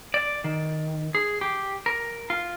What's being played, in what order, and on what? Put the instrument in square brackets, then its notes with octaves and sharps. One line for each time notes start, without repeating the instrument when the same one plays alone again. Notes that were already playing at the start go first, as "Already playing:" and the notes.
[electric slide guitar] D5
D#3
G#4
G4
A#4
F4